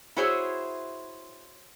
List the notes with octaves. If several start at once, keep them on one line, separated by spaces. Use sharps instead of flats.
E4 F#4 G#4 C5 C#5 E5